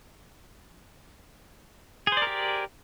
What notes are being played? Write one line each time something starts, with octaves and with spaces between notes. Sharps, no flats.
G4 G#4 A#4 C5 D5